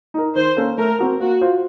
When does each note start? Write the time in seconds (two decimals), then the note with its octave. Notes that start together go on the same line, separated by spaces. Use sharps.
0.14 D#4 A#4
0.35 D#3 C5
0.57 A#3 C#4 A4
0.78 A3 A#4
0.99 C4 F#4 A#4
1.20 A#3 F#4
1.41 F4 C5